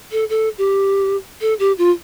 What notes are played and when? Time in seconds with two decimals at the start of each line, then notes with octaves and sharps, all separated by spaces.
0.12 A4
0.30 A4
0.58 G4
1.41 A4
1.59 G4
1.78 F4